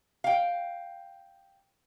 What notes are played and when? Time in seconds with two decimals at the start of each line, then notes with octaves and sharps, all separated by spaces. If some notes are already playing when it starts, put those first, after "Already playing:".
0.24 F5 G5